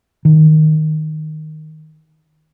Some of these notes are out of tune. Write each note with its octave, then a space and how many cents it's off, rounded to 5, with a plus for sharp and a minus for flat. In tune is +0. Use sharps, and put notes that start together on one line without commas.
D#3 -5